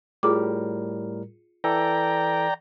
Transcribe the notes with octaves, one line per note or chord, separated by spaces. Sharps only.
A2 G3 F4 G#4 A#4 D6
E3 A4 D5 G5 A#5